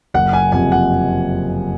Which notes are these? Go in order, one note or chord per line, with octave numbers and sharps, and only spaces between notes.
F#1 F#5
G#5
F2 C3 G#5
F#5